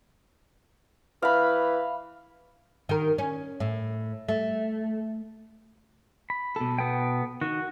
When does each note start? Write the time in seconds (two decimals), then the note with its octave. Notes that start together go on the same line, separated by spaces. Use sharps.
1.22 E3 F5 B5
2.89 D#3 A#4
3.18 C#4
3.60 A2
4.29 A3
6.30 B5
6.56 B2 A4
6.79 B3 G5
7.42 D#3 F#4